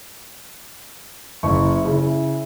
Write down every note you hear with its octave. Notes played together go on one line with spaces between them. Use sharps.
F#1 E4 C#6
C#3 E4